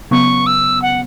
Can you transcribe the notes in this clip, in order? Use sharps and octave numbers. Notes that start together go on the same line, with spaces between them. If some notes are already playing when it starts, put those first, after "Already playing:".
C#3 F#3 B3 C#6
E6
F#5